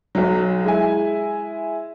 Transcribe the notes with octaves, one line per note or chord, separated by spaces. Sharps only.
B1 F#3
G#3 E4 G#5